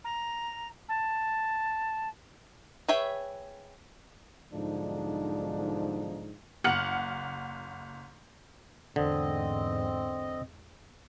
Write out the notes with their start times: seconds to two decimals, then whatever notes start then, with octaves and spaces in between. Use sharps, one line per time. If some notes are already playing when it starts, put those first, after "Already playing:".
0.04 A#5
0.89 A5
2.88 G#4 B4 C#5 E5 G5
4.52 B1 G#2 D3 F3 D4 D#4
6.64 F#1 F#5 F6 C#7 F#7
8.96 E2 G#2 D3 C4 D#5